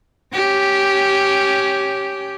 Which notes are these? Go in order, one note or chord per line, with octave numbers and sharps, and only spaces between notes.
C#4 G4